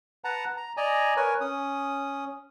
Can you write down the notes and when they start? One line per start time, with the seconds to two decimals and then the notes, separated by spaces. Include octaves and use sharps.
0.24 B4 F#5 A5 A#5
0.57 A#5
0.77 D5 D#5 G#5 A#5
1.17 A#4 B4 C#5 G#5
1.41 C#4 D#6